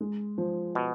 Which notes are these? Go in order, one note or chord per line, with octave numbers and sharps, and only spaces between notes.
G#3
F3
B2